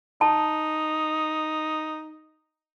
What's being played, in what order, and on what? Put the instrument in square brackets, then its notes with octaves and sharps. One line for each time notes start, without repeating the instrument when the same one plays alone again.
[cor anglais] D#4 [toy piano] A5